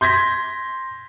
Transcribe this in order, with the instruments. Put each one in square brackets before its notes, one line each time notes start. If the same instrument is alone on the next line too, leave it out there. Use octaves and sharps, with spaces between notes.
[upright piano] C6 G6 G#6 A#6 B6